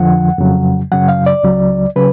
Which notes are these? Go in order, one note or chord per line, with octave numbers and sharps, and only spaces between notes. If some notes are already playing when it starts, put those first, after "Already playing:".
Already playing: F2 D3 F3 F#5
F2 C#3 F#3
F#2 C#3 F#3 F#5
F5
D5
C#2 C#3 F#3
C#3 F#3 B4